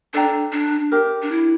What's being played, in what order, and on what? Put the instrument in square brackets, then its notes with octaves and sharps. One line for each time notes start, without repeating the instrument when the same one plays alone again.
[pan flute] D4 [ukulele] A4 D5 G5 A#5
[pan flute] D4
[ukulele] G4 A#4 E5
[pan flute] D4
E4